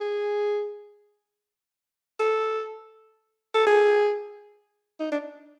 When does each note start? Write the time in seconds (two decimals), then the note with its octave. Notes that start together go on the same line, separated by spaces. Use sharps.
0.01 G#4
2.20 A4
3.55 A4
3.67 G#4
5.00 D#4
5.12 D4